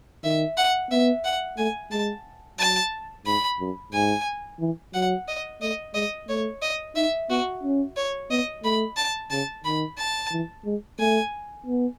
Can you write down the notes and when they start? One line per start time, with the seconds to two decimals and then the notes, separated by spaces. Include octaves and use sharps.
0.24 D#3 E5
0.57 F#5
0.91 B3 E5
1.25 F#5
1.58 A3 G#5
1.91 G#3 A5
2.59 F#3 A5
3.26 G#2 B5
3.60 F#2
3.93 G#2 G#5
4.60 E3
4.94 F#3 F#5
5.28 D#5
5.61 A3 D#5
5.94 G#3 D#5
6.28 A3 C#5
6.62 D#5
6.96 D#4 E5
7.29 B3 F#4
7.63 C#4
7.97 C#5
8.30 B3 D#5
8.64 A3 B5
8.97 A5
9.30 C#3 A5
9.64 D#3 B5
9.98 A5
10.32 E3
10.65 G#3
10.99 A3 G#5
11.66 B3